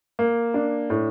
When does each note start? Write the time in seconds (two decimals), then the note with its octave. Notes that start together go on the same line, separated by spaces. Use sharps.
0.19 A#3
0.54 D4
0.90 A2